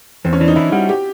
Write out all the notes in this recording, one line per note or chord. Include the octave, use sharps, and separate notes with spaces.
E2 C4
C#4
E3 D4
D#4
E3 E4
G3 F#4
G4